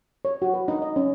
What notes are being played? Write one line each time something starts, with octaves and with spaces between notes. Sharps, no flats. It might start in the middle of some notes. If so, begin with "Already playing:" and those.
C#5
F#4
B4
D#4
D#5
C#4